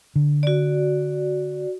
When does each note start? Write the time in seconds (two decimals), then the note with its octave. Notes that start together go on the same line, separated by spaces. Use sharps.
0.16 D3
0.43 F#4 D5